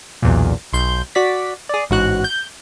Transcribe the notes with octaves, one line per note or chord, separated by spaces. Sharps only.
B1 E2 A#2
B1 C6 G6
F#4 D5 B6
G#4 D5
A1 G#2 F#4 F#6
G6